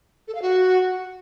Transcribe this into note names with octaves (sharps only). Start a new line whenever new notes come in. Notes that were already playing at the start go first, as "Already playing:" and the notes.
A4
F5
F#4